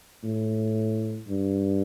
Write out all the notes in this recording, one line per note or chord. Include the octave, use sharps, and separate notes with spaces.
A2
G2